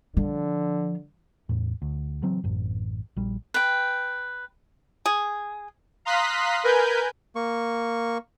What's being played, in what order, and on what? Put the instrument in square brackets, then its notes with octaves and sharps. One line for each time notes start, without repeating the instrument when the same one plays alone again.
[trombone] D3 [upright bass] F3
[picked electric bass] E2 A2
D2
C#3 E3 F#3 C4
A1 F#2
A#1 G3
[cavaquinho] B4 G5
[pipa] G#4
[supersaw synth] F5 A#5 C6 D#6 F#6 B6
A#4 B4 G#5 G6
[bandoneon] A#3 C#6